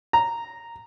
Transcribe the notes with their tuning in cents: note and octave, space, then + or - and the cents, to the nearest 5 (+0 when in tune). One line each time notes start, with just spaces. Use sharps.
A#5 -5